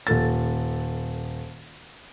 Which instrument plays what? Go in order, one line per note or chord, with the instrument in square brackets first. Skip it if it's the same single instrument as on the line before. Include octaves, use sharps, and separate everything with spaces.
[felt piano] D#1 A4 A6